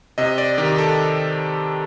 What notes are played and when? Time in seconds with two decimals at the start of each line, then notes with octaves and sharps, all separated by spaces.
0.18 C3 D#5
0.38 D5
0.58 D#3 G4
0.78 A4